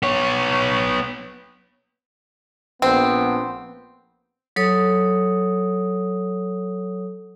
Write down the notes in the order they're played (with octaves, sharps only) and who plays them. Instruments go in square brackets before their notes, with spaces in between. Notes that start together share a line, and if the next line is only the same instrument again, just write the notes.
[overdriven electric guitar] B3 C#5
[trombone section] A#1 B3 [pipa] C4
[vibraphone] F#3 A4 C#5 D#6